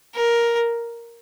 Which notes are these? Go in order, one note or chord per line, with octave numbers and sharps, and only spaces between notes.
A#4